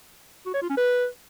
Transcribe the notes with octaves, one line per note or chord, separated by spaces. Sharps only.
F#4
C#5
F4
C#4
B4